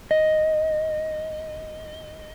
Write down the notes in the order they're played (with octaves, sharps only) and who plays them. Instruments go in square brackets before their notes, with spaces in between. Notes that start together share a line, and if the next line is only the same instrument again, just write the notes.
[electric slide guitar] D#5